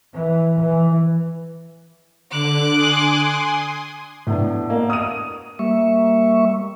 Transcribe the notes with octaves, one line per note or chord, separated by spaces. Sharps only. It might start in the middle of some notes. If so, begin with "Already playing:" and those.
E3
E3
D3 D6 F#6
G#5 C6 D#6
A2 B3 D4
A#3
D#6 D#7
G3 A#3 E5 C#6